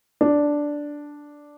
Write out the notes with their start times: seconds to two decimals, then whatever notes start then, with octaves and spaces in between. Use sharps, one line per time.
0.21 D4